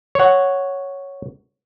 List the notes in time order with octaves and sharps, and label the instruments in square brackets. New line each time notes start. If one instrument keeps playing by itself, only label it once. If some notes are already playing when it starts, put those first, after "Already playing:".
[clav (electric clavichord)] C#5 F#5